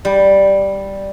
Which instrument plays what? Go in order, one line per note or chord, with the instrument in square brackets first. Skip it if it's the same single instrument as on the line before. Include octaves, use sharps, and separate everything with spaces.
[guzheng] G3